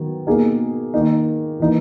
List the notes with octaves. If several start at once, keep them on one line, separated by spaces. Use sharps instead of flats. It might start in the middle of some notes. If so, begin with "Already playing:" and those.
Already playing: D#3 F#3 B3
B2 A#3 D#4 G#4
D#3 A#3 D#4
E3 A#3 D#4